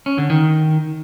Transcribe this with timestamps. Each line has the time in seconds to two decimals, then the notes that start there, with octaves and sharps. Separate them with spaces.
0.06 C#4
0.18 D3
0.30 D#3